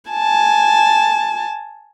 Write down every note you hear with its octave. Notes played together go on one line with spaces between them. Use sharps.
G#5 A5